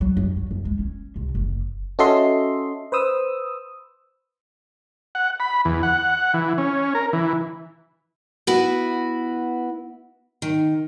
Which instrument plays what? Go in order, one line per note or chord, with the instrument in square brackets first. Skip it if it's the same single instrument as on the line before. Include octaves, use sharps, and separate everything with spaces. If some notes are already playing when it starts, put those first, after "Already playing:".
[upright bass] F#3
F#2
F#3
F#2
G#3
C#4
C2
F#1
[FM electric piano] C#4 F#4 A4 D#5 E5 C6
B4 C5 D#6 E6
[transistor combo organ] F#5
B5
E2
F#5
E3
C#4
A#4
E3
[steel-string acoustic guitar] B3 E4 F#4 B4
D#3